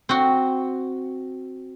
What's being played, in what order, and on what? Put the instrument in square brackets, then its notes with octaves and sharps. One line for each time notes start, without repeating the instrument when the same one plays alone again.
[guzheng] C4 F#4